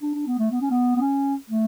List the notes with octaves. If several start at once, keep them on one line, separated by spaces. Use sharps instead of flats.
D4
D4
B3
A3
B3
C#4
B3
B3
C#4
A3